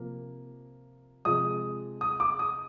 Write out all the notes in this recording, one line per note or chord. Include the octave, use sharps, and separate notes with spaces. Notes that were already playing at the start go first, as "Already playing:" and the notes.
Already playing: C3 F3 A#3
C3 F3 G#3 D#6
D#6
D6
D#6